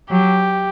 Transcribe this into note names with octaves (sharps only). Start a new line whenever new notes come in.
F#3 G4